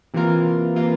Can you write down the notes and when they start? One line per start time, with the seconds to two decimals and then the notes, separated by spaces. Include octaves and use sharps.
0.14 C3 E3 A#3 F4 A#4
0.75 C3 E3 A#3 F4 A#4